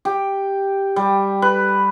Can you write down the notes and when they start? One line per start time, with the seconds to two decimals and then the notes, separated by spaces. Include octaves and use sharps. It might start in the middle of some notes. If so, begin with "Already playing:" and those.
0.05 G4
0.96 G3
1.42 B4